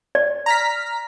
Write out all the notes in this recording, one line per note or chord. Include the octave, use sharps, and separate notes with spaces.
D5
A#5 F6 B6